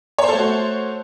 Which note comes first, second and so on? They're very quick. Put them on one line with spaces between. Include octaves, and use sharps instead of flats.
C#5 C5 A4 A3 F#4